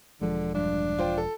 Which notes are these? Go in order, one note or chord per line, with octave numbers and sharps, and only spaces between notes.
E1 D3 F3 G#3
G2 D4
F4 C5 G5
A4